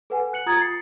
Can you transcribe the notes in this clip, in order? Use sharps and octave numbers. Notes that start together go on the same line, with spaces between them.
A4 B4 F#5 G#5
F#6 C#7 F#7
F4 A#5 D#6 G#6 A6
A6 C7 C#7